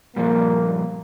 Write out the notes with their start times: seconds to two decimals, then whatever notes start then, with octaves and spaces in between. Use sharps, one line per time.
0.16 G2 A#2 F3 A#3